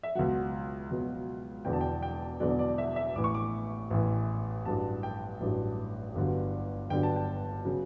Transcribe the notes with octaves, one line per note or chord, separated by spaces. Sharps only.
E5
C#2 B2 F#3 F#5
C#2 B2 F#3
E1 E2 D3 F#3 G5
A5
G5
G5
E1 E2 D3 F#3 D5
D5
E5
E5
A1 A2 E3 D6
C#6
D6
A1 A2 E3
A1 G2 F#3 A5
G5
A1 G2 F#3
G1 G2 D3 F#3
G1 G2 D3 F#3 G5
A5
G5
C#3 F#3